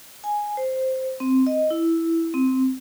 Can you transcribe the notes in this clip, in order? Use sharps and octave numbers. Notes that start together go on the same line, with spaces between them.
G#5
C5
C4
D#5
E4
C4